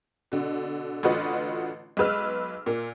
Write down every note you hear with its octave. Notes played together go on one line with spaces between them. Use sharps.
B2 D3
A1 D3 F4 F#4 B4 D#5
B1 G#3 B4 E6 F6
A#2 A#3